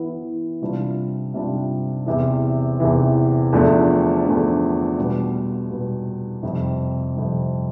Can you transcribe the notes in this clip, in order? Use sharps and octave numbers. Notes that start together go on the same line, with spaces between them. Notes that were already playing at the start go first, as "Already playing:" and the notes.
Already playing: E3 B3 E4
C3 G3 D4 F4
C3 G3 D4 F4
E2 C3 E3
E2 C3 E3
E2 D3 F3 A3 D4
E2 D3 F3 A3 D4
B2 G3 B3
B2 G3 B3
F2 C3 G3
F2 C3 G3